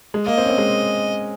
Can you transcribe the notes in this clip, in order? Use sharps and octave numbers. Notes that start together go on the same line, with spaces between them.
G#3
A#3 D#5
C4
C#4
C4
G#3